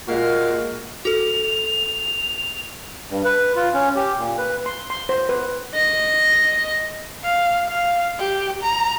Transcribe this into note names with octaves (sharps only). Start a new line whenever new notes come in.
A#2 G#3 F#4 A#4 F5
F#4 A4 F7
G2
B4
F4
C#4
G4
A#2
B4
C6
C6
C5
B4
D#5
F5
F5
G4
A#5